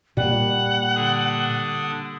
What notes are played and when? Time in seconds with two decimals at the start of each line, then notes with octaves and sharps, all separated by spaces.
0.17 A#2 G3 A#3 F#5
0.95 D3 D4 D#6